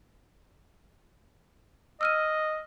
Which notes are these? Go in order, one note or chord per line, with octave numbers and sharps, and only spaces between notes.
D#5 E6 F6 D#7